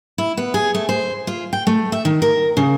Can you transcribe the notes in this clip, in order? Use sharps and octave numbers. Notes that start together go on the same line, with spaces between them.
E4
B3
G#4
A3
C5
F4
G5
A3
E5
D#3
A#4
C#3